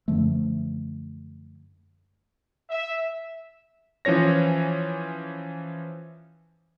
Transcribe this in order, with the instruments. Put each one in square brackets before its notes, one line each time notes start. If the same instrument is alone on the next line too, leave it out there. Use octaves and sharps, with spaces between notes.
[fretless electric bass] F#2 D3 F3 A3
[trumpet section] E5
[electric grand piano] E3 F3 C#4 C#5 A#6